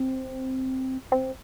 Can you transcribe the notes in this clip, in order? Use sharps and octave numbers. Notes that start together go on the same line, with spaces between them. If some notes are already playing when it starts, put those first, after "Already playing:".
Already playing: C4
C4